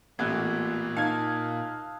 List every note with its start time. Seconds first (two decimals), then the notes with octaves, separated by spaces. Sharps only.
0.19 A1 A#2 B3 E6 F#6 G#6
0.97 D#4 F5 A5 D#6 G#6